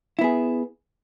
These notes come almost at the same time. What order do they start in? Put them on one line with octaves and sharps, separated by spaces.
E4 B3 G#4